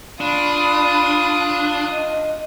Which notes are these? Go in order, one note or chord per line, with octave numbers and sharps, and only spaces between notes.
D4 F4 B5 D#6
D#5